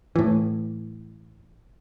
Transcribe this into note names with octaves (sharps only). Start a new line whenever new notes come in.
A2 E3